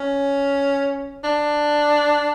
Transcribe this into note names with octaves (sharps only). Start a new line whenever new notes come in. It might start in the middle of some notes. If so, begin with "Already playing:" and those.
Already playing: C#4
D4